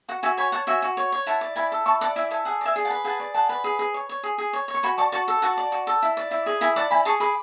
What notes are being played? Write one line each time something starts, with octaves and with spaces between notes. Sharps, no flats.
F#4 F#5
F#4 E5 G#5
C#5 G#5 B5
C#5 F#5 A5
F#4 E5 G#5
F#4
C#5
C#5
E4 F#5 A5
D5
E4 G#5 B5
A4
E4 A5 C#6
D5 F#5 A5
E4 E5 G#5
A4 E5 G#5
G#4 F#5
D5 E5 G#5
G#4
F#5 A5
B4
G#4 F#5 A5
D5
G#4 F#5 A5
B4
G#4
G#4
C#5
C#5
G#4
G#4
C#5
C#5
C#6
F#4 G#5 B5
D5 A5 C#6
F#4 A5 C#6
A4
F#4 F#5 A5
D5
F#4
A4
E4
D5
E4
G#4
E4 G#5 B5
D5 F#5 A5
E4 G#5 B5
G#4 A5 C#6
G#4 B5 D6